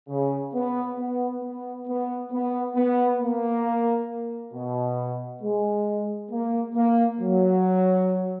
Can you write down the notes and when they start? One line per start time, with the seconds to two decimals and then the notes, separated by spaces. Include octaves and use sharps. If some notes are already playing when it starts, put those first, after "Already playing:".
0.09 C#3
0.54 B3
0.99 B3
1.43 B3
1.87 B3
2.32 B3
2.76 B3
3.20 A#3
4.54 B2
5.42 G#3
6.31 A#3
6.76 A#3
7.21 F#3